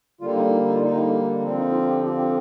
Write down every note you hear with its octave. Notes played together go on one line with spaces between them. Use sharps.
D3 G3 A#3 F4
D#4
D#4
F4
D3 G3 A#3 D#4
D3 F3 C4 D4
D#4
F4
G4
D3 F3 C4 G4
G4